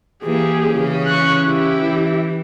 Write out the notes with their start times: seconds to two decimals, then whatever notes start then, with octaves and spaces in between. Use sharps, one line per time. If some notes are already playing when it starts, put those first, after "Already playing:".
0.23 E3 A#3 G4 G#4
0.70 C#3 E3 C#4
1.07 C#6 F#6
1.46 E4 G4
1.81 E3